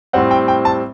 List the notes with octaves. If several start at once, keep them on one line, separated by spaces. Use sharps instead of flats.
A2 G3 C4 F#5
G5
G5
A5